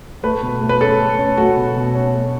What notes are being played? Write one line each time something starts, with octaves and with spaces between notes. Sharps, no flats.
A3 B4
B2
A3
B4
C#4 A4
A3
C#4
A3 F#4
B2
B2
C#4
A3